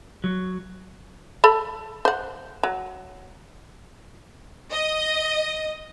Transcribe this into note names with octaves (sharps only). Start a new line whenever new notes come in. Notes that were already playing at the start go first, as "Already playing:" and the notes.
F#3
A4 B5
C5 F#5
F#3
D#5